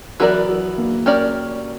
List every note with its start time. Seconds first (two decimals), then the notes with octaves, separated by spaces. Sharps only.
0.20 E3 F#3 B3 E4 A#4 D5
0.49 F#3
0.78 A#3
1.06 C#4 G4 A#4 D5